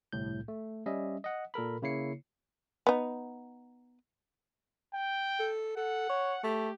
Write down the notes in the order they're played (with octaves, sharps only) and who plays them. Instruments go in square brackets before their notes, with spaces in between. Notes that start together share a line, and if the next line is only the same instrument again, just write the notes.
[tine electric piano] G1 C2 A2 G6
A3
G3 C#4 D#5 E5
D#5 F#5
A#2 A4 A#4 B5
C#3 A#3 E4 C#5 C7 C#7
[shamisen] B3 D#4
[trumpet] G5
[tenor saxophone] A4
[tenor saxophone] A4 [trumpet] F#5
[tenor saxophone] C#5
[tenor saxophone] A3 [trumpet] G4